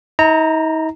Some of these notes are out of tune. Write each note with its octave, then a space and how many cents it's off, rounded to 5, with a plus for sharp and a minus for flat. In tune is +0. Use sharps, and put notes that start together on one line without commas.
D#4 +40 A#5 -15